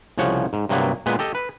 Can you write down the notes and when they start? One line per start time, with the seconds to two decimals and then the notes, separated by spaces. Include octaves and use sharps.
0.18 C2 C#3 F3 C#5 F#5
0.53 G#2
0.69 G2 C3 F#3 A#3 B3
1.06 A#2 G#3 B3 B4
1.19 G4 A4 D#5
1.35 B4